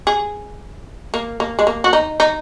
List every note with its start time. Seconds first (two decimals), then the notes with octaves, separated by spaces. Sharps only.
0.07 G#4
1.14 A#3
1.40 A#3
1.59 G#3
1.67 A#3
1.84 F#4
1.93 D#4
2.20 D#4